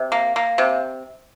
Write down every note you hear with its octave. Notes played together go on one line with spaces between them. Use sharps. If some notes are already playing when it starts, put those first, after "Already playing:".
Already playing: C3
A#3
A#3
C3